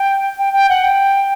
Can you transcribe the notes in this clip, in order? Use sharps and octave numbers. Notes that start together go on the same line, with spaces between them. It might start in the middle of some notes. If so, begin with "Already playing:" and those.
Already playing: G5
G5
G5
F#5
G5